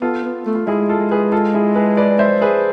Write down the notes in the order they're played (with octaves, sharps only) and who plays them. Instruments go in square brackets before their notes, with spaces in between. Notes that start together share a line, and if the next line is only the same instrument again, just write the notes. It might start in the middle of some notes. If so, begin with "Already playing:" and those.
[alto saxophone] B3 [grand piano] F4 A4
[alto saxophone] B3
A3
[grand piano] F4
[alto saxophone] G#3 [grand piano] E4 G#4
[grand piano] F4 A4
[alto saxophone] G#3
[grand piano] G#4 B4
F4 A4
E4 G#4
G#4 B4
B4 D5
C5 E5
G#4 B4